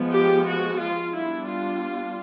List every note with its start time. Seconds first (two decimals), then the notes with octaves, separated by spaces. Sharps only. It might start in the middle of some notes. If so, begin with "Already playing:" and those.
Already playing: F3 G#3 B3
0.11 G4
0.46 F#4
0.79 F4
1.12 G3 B3 D4 E4
1.46 F4